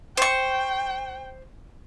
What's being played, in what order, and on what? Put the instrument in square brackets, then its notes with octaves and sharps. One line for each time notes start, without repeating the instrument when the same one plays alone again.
[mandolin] C5 C#6 [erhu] G5